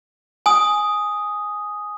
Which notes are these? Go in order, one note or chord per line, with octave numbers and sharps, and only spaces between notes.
G#5 D#6